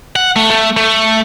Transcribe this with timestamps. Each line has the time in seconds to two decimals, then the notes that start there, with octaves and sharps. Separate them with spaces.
0.16 F#5
0.36 A3
0.50 A3
0.77 A3